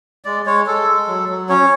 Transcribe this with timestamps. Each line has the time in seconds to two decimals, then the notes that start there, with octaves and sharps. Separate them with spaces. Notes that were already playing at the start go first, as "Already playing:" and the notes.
0.25 G#3 D5
0.46 G#3 C#5
0.67 G#3 A4
0.88 G#3
1.07 F#3
1.29 F#3
1.49 C#4 C#5